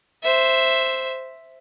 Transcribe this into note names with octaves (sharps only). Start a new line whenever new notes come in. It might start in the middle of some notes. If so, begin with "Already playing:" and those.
C5 E5